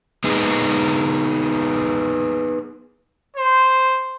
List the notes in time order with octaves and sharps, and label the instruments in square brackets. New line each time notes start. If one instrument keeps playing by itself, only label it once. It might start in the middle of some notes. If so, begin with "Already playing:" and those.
[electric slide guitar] B3 D#4 G#4
[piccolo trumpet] C5